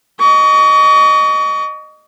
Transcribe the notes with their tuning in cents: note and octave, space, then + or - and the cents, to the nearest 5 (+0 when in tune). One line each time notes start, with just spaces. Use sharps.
D#5 -20 C#6 +35